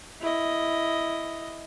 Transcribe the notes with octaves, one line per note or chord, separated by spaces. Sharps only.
E4 D#5